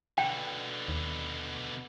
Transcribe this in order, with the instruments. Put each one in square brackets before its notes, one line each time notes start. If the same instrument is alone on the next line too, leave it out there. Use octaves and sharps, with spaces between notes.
[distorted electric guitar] B2 D3 [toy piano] G5
[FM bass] D#2